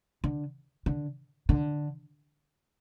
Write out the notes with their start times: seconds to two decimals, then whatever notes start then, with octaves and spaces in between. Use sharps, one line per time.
0.24 D3
0.86 D3
1.49 D3